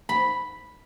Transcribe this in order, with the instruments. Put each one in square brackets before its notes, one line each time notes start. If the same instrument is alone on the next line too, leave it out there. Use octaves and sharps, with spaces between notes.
[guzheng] B5